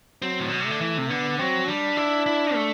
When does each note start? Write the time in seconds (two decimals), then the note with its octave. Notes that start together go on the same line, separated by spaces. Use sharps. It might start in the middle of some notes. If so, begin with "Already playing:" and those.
0.22 F#3 C4
0.40 A2
0.49 B2
0.60 C3
0.66 D3 A3
0.81 E3
0.98 C3
1.10 D3 B3
1.39 F#3 C4
1.68 G3 D4
1.97 E4
2.26 E4
2.54 A3